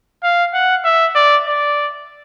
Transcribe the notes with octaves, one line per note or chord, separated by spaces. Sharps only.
F5
F#5
E5
D5
D5